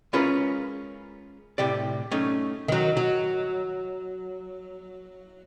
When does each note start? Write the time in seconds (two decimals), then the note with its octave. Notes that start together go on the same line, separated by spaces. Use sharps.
0.13 G#3 C#4 F4 G#4 A#4 B4
1.58 A2 C3 G4 D5
2.11 A3 C#4 D#4
2.68 D#3 F#3
2.97 F#3